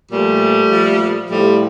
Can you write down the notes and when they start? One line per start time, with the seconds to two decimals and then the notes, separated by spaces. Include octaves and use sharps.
0.11 A#2 F3 G3 A3
0.71 A#2 F3
1.30 A2 F3 G3 A3